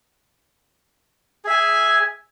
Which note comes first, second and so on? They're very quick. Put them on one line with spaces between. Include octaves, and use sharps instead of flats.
G#4 E5 G#5